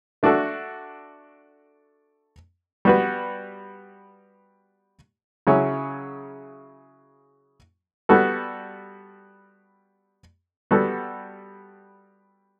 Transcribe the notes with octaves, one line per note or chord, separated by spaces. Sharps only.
A3 D4 F#4 A4
G3 B3 F#4 B4
C#3 F#3 C#4 E4
G3 B3 F#4 A4
G3 B3 F#4 A4